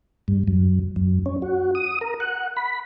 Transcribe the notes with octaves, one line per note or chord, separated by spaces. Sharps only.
G2
F#2
F#2
C#4
F#4
D#6
A#4
F#5
B5